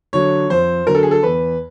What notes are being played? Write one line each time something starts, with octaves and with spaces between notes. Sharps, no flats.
D3 F#3 C#5
F2 C5
D3 F#3 A#4
A4
G#4
A4
E2 B4